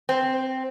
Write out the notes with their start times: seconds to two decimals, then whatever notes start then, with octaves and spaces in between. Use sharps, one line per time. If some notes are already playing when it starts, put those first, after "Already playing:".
0.09 C4